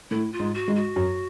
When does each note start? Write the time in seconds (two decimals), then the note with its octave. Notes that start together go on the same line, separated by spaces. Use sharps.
0.11 A2 A3 E4
0.33 F4
0.40 G#2 G#3
0.54 F#4
0.68 G#2 G#3
0.76 F#4
0.96 F#2 F#3